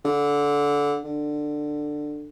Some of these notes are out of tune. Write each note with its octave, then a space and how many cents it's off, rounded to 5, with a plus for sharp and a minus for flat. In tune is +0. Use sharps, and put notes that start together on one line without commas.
D3 -20
D3 +15